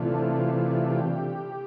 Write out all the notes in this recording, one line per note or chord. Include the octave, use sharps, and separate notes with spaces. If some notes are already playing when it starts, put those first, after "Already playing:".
Already playing: C3 E3 A3 D4 F4
G4